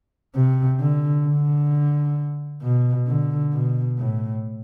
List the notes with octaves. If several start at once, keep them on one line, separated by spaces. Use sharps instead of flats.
C3
D3
D3
B2
D3
B2
A2